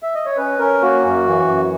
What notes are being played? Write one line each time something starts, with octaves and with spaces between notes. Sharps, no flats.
E5
D#5
C#5
C#4 B4
C#4 A#4
A#3 F#4
F#2
E3
F#2